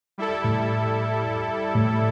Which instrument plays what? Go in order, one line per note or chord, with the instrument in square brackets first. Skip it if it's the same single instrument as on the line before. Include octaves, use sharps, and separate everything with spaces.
[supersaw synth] G3 E4 A4
[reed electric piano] A2
A2